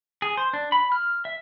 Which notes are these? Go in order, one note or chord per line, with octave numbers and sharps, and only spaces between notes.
G#4
C5
D4
B5
F6
E5